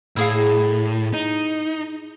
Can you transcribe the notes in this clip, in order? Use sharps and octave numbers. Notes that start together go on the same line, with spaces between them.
A2 E4 G#4 F5
D#4